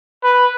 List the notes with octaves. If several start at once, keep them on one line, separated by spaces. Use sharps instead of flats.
B4